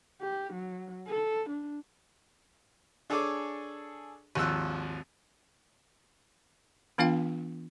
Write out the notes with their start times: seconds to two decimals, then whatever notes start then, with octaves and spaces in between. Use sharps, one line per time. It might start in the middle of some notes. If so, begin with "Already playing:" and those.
0.21 G4
0.54 F#3
1.08 A4
1.50 D4
3.10 D4 G#4 A4 C#5 G#5 D6
4.35 G#1 D#2 F3 E6 F#6
6.98 E3 B3 D4 F4 F5 G5